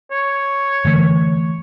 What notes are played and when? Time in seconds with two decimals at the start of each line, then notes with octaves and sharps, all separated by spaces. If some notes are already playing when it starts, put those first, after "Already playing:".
0.12 C#5
0.85 D3 E3 A3